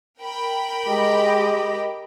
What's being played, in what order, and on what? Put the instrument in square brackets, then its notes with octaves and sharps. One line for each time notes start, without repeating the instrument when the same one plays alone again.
[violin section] A#4 G5 B5
[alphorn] G#3 [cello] G4 D#5